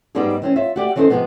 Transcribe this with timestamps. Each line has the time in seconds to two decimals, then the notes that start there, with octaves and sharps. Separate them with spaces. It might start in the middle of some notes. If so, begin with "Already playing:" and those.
0.15 G#2 G3 B3 C4 D#4 G#4
0.42 E3 C4 C#4
0.56 F4 C#5 E5
0.76 F#4 G4 D5 F#5
0.96 E3 C4 C#4 D#4 A4 C5
1.10 C3 D#3 F3 G#3 B3